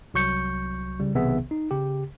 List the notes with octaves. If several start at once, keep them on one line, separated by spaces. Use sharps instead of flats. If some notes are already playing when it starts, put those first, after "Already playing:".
C2 F#3 C#6 G6 C#7
C#3 G3
B1 C3 D#3 B3 G#4 E5
D#4
C#3 G4